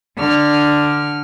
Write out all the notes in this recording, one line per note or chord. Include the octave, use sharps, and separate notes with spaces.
D3 F6